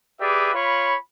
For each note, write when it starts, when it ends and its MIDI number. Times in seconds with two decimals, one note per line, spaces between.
0.21 0.52 67
0.21 0.52 68
0.21 0.52 71
0.21 0.52 74
0.21 0.52 76
0.55 0.96 65
0.55 0.96 73
0.55 0.96 83